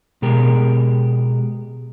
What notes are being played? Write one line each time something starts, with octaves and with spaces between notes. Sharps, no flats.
B2 G#3 G4 A#4